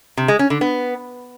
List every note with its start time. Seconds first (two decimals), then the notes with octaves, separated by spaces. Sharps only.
0.17 C3
0.28 G#3
0.39 C#4
0.50 D3
0.61 B3